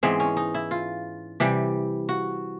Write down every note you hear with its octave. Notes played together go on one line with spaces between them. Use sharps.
G#2 E3 G#3 B3 C4
C#4
D#4
E4
F4
C3 E3 G3 G4
F#4